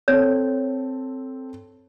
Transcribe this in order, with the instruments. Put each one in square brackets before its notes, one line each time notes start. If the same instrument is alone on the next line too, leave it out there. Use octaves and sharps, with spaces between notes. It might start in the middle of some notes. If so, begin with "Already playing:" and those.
[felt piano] C4 A4 [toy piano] C#5